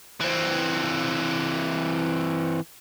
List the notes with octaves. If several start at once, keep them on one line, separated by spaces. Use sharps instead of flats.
E3 C4